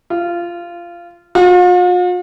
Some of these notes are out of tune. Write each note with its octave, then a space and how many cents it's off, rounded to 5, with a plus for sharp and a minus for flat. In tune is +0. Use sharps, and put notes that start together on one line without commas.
F4 -15
F4 +45